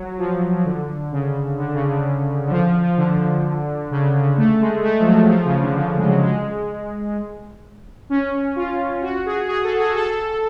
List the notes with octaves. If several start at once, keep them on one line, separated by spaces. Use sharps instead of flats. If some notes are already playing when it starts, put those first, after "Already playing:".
Already playing: F#3
F3
D3
C#3
D3
C#3
D3
D3
F3
F3
F3
D3
C#3
A3
G#3
A3
F3
F#3
F3
C#3
D3
F3
G#3
F#3
G#3
C#4
F4
F#4
G#4
G#4
A4
G#4
A4